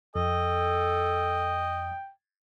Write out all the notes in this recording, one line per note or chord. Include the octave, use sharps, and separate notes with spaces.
F2 A4 D#5 G5